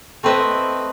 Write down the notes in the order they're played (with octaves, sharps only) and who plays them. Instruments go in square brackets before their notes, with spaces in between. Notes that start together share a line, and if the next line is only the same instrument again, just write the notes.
[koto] A3 C4 E4 B4 D#5 E5